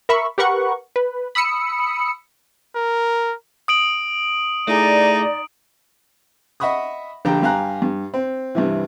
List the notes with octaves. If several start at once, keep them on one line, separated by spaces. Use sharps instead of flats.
A#4 E5 B5 C#6
G4 A#4 B4 F#5 C#6
B4
B5 D#6 E6 C#7
A#4
D#6 D7 F#7
A3 D#4 E4 G#4 D5
D#5 E5 F#5 B5 C#6 D#6
A#1 D3 G4 G5 A#5
G2 G4 F5 G#5 A#5 F#6
G2
C4
G2 C3 E3